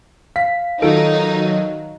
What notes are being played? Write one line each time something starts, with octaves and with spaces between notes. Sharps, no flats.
F5 B6
D#3 F#3 D#4 F4 A4 D7